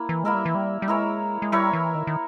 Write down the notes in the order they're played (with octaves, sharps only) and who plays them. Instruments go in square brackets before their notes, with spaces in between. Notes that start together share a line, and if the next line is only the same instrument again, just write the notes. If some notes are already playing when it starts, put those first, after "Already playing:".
Already playing: [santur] A#3 E4
[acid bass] E3
[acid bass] G#3 [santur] A#3 E4 A#4 E5
[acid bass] G3
E3
G3
G3
[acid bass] G#3 [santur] E4 A#4 C#5 E5
[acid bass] G#3
[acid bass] G3 [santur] E4 A#4 C#5 E5
[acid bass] E3
D#3
D#3